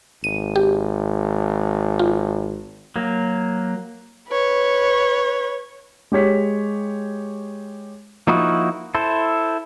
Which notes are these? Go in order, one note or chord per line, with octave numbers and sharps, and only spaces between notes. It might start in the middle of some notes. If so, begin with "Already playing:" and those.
G#1 D#7
G4
F4
F#3 A#3
B4 C#5
G#3 G4 C#5 B6
F3 A#3 D#4 E4 F#4
E4 A4 C5